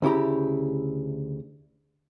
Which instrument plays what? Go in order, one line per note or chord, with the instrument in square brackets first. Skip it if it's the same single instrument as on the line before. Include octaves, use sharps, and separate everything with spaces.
[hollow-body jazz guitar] D2 C#3 E4 G4 A#5